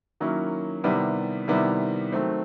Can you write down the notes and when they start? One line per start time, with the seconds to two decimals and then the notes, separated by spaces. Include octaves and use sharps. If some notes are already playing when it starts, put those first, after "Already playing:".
0.20 D#3 F#3 A#3 C#4 E4
0.84 C3 D#3 G3 B3 E4
1.48 C3 D#3 G3 B3 E4
2.12 D#3 F#3 A3 C4